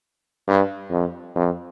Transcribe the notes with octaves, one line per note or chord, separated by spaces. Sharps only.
G2
F2
F2